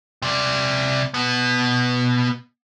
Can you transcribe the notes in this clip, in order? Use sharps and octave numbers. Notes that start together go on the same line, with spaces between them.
C3 D5
B2 B3